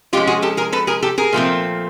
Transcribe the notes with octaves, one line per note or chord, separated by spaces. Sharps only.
F3 G#3 C#4 F4 G4
F#4 G#4
G4 A4
G#4 A#4
A4 B4
G#4 A#4
G4 A4
G#4 A#4
A#2 F3 A3 C4